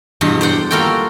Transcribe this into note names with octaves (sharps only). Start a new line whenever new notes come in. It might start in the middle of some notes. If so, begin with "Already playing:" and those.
E2 G2 B2 F#5 C6
C5 D5 F#5 G5
G3 A#3 F4 F#4 A4 G5